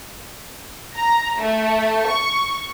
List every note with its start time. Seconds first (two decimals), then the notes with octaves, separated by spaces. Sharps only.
0.96 A#5
1.38 A3
2.08 C#6